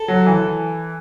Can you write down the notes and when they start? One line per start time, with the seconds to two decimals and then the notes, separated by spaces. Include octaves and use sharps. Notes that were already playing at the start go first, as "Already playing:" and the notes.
Already playing: A4
0.08 F#3
0.26 E3